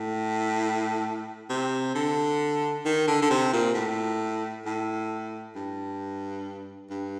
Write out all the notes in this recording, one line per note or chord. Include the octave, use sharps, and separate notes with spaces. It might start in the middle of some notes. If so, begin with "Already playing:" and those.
Already playing: A2
C3
D3
D#3
D3
D3
C3
A#2
A2
A2
G2
G2